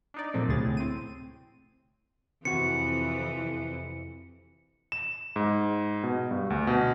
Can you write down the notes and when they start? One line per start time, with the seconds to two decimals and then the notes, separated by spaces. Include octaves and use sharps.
0.14 D4 D#4 D5
0.34 A#2 F3 A3 C4
0.48 D2 A2 C3 G#4 A6
0.64 A2
0.77 C4 D#7
2.45 F2 C3 E3 F#4 C#7
4.92 E7
5.36 G#2
6.03 B2
6.31 G2
6.50 D2
6.67 B2